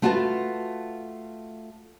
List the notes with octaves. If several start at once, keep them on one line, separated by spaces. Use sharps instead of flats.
A3 F4 F#4 B4 E5 A5